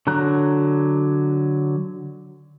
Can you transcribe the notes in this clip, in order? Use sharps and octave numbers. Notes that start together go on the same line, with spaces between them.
D3 F#3 A#5 F#6